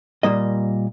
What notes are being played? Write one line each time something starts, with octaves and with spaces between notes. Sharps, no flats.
A#2 G3 A#3 D#5